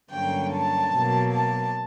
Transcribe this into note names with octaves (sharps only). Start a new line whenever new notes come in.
G2 D3 F#3 A#3 C#4 G5
A5
B2 F#3 A#3
A5